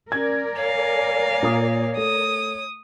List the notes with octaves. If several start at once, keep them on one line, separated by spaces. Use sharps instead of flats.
C#4 A#4 D5 G#6
C#5 F5 G#5
A#2 A#3 D#6
A3 D#6